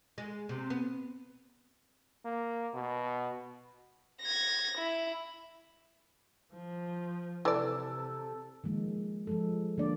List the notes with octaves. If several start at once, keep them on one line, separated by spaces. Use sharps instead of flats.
G#3
C3
B3
A#3
B2
G#6 A#6
E4
F3
C3 E3 A4 D5
D#3 F3 G#3 A#3
F3 G#3 A4
D3 F3 A#3 D4 D5